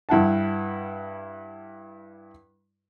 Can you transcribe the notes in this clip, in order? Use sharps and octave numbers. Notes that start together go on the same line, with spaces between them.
G2 E4 F#5 A5